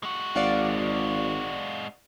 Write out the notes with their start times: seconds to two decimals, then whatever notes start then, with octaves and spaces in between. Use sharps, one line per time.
0.03 G#3 F#4
0.35 G#1 D5 F5 F#5